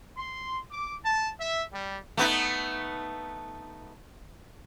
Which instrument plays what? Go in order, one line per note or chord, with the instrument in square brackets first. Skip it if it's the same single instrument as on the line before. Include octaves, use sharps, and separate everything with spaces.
[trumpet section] C6
D6
A5
E5
G3
[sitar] A3 B3 D#4